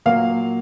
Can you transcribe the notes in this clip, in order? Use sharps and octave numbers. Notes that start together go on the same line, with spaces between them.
A#2 F#3 A#3 F5